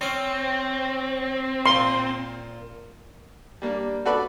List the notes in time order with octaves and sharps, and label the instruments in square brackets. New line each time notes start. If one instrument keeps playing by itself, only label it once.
[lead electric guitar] C4 [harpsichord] C#4
[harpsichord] A#2 [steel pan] C6
[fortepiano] G3 A#3 D4
F#4 A4 B4 D5 B5